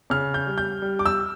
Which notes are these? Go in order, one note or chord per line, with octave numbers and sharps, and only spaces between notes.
C#3 F6
G6
G3
G6
G3
D6
E6